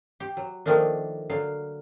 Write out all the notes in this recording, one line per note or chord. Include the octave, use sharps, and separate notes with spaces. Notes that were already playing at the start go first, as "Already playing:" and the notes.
G4
F#3
D#3 F3 A3 A#3 D4
D3 F#3 F5